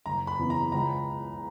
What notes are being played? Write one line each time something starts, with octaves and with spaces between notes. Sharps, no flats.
F#1 A#5
B5
E2 C#3
A#5
C#2 A#5